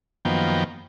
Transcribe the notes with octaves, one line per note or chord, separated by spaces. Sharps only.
F#2 D#3 F3 A#3 B3 G5